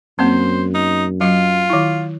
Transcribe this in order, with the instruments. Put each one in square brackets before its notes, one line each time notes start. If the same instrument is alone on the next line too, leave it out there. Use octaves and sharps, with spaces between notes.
[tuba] F#2 [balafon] A#3 C4 [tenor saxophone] C5
[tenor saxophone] D#4
[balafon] F#3 D#5 [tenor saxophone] F4
[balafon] D#3 E4